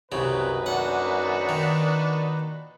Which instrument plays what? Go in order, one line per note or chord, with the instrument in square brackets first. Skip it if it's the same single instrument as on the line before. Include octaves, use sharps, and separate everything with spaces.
[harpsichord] C2 C#3 [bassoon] F#2 [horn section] A#2 D#4 B4
[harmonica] D4 F#4 [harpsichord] F#5
[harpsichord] D#3